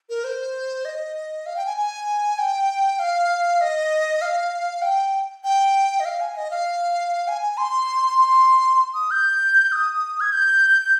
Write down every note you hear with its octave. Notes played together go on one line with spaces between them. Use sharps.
A#4
C5
D#5
F5
G5
G#5
G#5
G5
F5
D#5
F5
G5
G5
D#5
F5
G#5
D#5
F5
G#5
G#5
C6
C6
D#6
G6
D#6
G#6
G6
G6